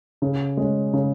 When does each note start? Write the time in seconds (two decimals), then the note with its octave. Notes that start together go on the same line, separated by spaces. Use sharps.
0.22 C#3
0.57 G#3 C#4
0.93 C#3